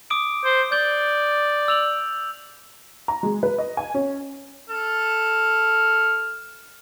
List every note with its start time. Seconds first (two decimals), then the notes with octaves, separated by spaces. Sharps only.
0.10 D6 D#6 D7
0.44 C5
0.72 D5 G6 G7
1.68 E6 F7 F#7
3.08 A#5
3.23 G#3
3.43 B4
3.58 D#5
3.77 G#5
3.94 C#4
4.70 A4 F6